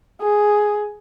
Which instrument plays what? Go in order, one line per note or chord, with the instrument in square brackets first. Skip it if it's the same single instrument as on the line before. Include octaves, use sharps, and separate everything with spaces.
[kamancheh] G#4